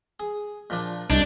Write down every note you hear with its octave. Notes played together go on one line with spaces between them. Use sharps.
G#4
A#2 F3 D4
C2 D4 D#4 C#6